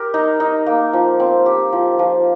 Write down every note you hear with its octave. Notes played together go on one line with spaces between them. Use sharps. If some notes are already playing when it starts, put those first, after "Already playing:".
Already playing: G4 A#4
D#4
D#4
A#3
F3
C4
G4
F3
F3